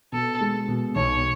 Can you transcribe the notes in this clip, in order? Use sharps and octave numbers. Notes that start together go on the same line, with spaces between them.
B2 A4
G#3
B2
B1 C#5